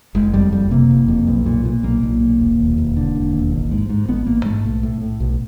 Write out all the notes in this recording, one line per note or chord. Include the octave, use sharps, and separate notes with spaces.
F#1 G#3
F2 G3
F#1 G3
C3 A#3
F#1
F2
B1
A#2
A#2
B1 A#3
B1
A#2
E1
D#2
E1
D3
E1
D#2
A1
G#2
G#2
A1 B3
A1 A#3
G#2 A3
B1
A2
A2
B1